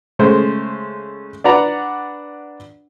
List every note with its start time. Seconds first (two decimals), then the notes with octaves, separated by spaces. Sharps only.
0.19 C#3 G#3 A3 C#4 C5
1.44 D4 B4 D5 F#5 A#5